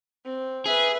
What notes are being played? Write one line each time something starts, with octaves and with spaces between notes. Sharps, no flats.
C4
G#4 B4 E5